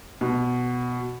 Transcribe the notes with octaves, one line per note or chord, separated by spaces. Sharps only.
B2